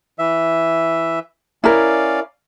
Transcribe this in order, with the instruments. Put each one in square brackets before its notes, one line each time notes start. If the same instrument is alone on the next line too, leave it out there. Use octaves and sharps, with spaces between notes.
[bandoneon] E3 E5
[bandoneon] C#4 D5 F5 [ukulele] E4 A#4